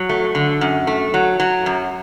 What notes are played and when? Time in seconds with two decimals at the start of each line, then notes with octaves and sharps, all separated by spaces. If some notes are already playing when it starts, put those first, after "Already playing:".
Already playing: F#3
0.09 A3
0.35 D3
0.61 F#2
0.87 A3
1.14 F#3
1.40 F#3
1.66 F#2